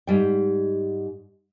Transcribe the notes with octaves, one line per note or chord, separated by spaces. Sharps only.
G#2 G3 G5